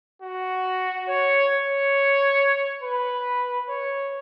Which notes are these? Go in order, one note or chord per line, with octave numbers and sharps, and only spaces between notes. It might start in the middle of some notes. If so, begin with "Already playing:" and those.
F#4
C#5
C#5
B4
C#5